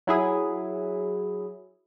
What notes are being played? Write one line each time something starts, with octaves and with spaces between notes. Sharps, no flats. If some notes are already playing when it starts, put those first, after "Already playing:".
F#3 E4 G#4